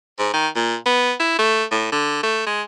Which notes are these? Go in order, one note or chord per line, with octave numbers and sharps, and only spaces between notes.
G#2
D#3
A#2
B3
E4
A3
A2
D3
A3
G#3